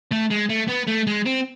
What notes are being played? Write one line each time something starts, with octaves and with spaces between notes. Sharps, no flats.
A3
G#3
A3
B3
A3
G#3
C4